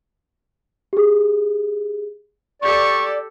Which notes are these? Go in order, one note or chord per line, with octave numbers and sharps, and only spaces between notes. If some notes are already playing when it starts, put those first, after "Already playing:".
G4 G#4
G4 A4 D5 C#6